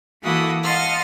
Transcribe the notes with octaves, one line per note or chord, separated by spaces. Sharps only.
E3 A#3 E4 F#4 A4 D#6
D#5 F5 F#5 A5 C6 F6